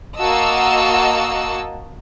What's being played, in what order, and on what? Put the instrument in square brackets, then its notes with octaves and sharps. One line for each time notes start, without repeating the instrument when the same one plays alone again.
[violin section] A#3 F#4 D#5 A5 E6